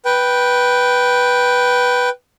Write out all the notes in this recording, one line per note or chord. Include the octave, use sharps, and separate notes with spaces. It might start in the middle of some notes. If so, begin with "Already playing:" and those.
B4 G5